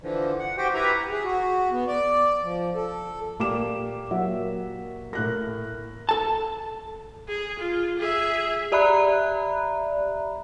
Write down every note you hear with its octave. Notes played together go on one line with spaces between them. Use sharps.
D3 E3 F3
F#5
F#4 G4 C5 G5
E4 G4 B4 E5 A#5
G#4
F#4
B3
D5
F3
A4
A#2 A#3 G4 D5 D6 E7
F#3 A#3 E5
A2 A#4 F#6 A#6
A4 A5
G#4
F4
G#4 E5
G4 D5 E5 A#5 B5 F#6